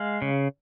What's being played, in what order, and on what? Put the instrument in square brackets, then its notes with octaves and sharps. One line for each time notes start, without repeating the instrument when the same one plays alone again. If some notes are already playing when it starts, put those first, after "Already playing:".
Already playing: [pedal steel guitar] G#3 F5
C#3